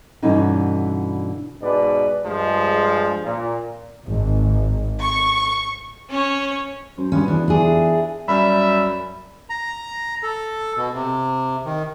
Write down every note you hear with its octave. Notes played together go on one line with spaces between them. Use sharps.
G2 B2 D3 E3 C#4 D#4
G#2 B2 B4 D5
G2 F3 G#3
A#2
G#1
C#6
C#4 C#5
F#2 C5
G2 B3 C#4 F4 F#4
E2 D4
D4 E4 G4 G#4 A#4
F#2 G3 E5 B5
A#5
A4
B2
C3
D#3